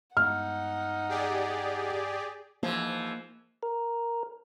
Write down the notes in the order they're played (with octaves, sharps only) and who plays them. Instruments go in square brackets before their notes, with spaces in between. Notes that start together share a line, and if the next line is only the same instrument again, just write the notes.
[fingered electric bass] G2 G#3 B3 [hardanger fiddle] D#4 F#5 [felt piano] F6
[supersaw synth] G4 G#4 D5
[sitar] G#2 E3 F3 [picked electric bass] A#3
[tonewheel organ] A#4